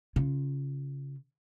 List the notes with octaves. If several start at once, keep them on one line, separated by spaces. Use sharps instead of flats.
C#3 F4